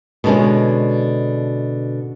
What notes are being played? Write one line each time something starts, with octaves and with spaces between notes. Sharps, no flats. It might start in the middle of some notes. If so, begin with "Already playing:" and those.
B2 D3 G#3 C#4